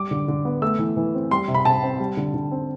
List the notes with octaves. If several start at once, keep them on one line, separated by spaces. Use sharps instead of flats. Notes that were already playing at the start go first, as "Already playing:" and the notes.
Already playing: G3 D6
D3
D3
B3
A3 E6
E3
E3
C4
G3 C6
C3
B5
C3 A5
C4
G3
D3
D3
C4